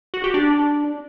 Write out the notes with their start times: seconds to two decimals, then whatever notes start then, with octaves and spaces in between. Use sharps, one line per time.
0.14 F#4
0.24 G4
0.34 D4